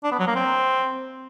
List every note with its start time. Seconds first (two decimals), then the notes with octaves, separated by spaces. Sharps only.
0.04 D4
0.11 B3
0.19 F#3
0.27 A#3
0.35 C4